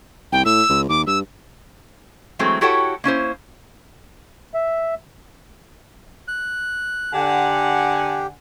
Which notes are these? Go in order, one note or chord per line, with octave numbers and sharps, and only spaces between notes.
C2 G5
A2 E6
C#2
D#2 D6
G2 E6
E3 F#3 G#3 A3 C4
E4 F#4 G4 A4 C#5 F#5
A#3 C#4 E4 C5
E5
F#6
D3 G4 F#5 G#5